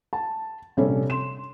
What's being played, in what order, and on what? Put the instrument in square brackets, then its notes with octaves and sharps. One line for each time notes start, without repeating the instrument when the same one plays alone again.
[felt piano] A5
A#1 C3 G3 C#4 A4
C6 E7